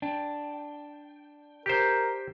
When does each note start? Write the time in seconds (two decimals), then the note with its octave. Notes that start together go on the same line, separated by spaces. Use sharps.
0.02 D4 G5
1.66 G4 A#4 C5